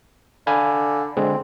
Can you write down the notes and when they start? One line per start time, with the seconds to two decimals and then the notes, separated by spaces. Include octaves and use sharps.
0.47 D3 F5 G#5 B5
1.17 D3 G#3 C4